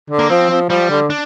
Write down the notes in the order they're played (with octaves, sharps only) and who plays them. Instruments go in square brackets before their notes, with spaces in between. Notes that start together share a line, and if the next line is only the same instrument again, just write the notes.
[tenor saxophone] D3
[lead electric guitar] A#3
[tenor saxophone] F3 [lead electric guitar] C4
[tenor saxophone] F3
[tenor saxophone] F3 [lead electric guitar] G3
[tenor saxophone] D3
[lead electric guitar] D4